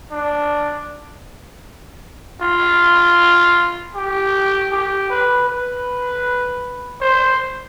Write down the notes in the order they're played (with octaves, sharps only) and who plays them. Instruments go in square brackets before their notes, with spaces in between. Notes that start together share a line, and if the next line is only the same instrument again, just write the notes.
[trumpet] D4
F4
G4
G4
B4
B4
C5